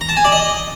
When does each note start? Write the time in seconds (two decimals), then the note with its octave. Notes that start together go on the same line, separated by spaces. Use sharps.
0.01 A#5
0.09 A5
0.17 G#5
0.24 D5
0.32 D#5